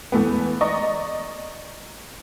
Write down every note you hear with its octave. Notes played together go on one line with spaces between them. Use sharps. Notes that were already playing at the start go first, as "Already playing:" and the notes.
E2 E3 A3 B3
D5 D#5 A#5 C#6